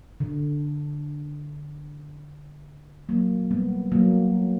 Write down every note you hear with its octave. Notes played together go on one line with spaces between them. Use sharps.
D3
F#3 A#3
G3 B3
F#3 A#3